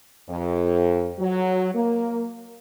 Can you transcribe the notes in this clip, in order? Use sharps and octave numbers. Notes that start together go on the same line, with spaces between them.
F2
F#3
A#3